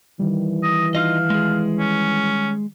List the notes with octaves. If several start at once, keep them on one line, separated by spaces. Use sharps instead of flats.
D#3 E3 G3
D#5
D#4 F4 D#5 F5
G#3 G#4
C#4